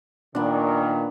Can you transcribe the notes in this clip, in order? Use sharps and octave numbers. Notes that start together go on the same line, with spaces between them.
A#2 D#3 B3 D4